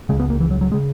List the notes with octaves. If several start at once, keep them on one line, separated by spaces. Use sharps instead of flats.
C#2 C#3 G#3
B3
A#3
E3
F#3
F#3
C#3 G#3